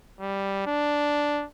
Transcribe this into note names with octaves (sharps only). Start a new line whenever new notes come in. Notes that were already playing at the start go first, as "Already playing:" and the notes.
G3
D4